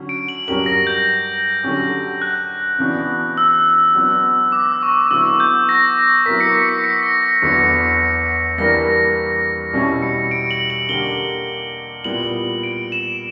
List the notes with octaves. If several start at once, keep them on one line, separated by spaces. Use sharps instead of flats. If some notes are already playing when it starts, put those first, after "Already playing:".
Already playing: D3 F#3 C#4 F#4
D7
F#7
G2 F#3 C#4 G4 A#4 F#7
A#6
G6
D3 F#3 C#4 G4
F#6
C#3 E3 B3 D4 F#4
E6
F#3 B3 D4
D6
E6
C#6
D6
D3 F#3 B3 E4 E6
G6
A#6
F#3 B3 E4 A#4 B6
C#7
B6
C#7
C#7
A#6
A#6
E2 D3 F#3 B3 C#7
E3 G3 A#3 D4 A#4 A#6
B2 G3 C#4 E4
C#7
D7
F#7
F#7
D3 A#3 D4 G4 A#4 G7
A#2 G3 B3 E4 F#7
D7
E7